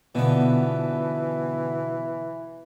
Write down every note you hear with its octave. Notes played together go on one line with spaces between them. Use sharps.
B2 D3 E3 F3 B3